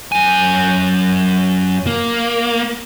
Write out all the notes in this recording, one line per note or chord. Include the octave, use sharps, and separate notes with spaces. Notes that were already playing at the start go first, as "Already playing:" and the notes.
F#2 G#5
A#3